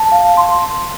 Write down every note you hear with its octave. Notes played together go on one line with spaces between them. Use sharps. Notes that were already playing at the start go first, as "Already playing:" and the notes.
Already playing: A5
F5
C6